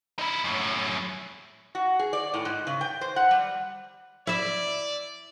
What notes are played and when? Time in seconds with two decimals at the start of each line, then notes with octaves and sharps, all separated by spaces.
0.19 D#4 E4
0.44 F#2 A2
1.75 F#4
1.99 G#4
2.13 D5
2.34 A2
2.45 G#2
2.67 C#3
2.81 G5
3.01 C5
3.16 F#5
3.31 G3
4.27 E4 D5 E5